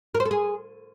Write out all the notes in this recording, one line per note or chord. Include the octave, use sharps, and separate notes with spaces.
A#4
C5
A4
G#4